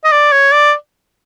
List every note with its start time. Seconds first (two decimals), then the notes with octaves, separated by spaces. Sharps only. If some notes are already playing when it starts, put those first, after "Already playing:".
0.04 D#5
0.12 D5
0.32 C#5
0.52 D5